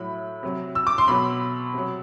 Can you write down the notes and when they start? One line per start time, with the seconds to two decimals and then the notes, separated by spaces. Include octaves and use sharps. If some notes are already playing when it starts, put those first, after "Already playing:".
Already playing: A2 F#3 B5
0.43 C3 F#3
0.75 E6
0.87 D6
0.98 C6
1.08 B2 F#3 B5
1.73 C3 F#3